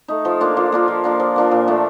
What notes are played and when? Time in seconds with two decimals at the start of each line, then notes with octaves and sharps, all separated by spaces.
0.08 A3 D#4
0.25 F3
0.40 A#3 D4 F4
0.57 F3
0.72 A#3 D4 F4
0.88 F3
1.04 A#3 D4 F4
1.20 F3
1.36 A#3 D4 F4
1.51 A#2
1.67 F3 A3 D4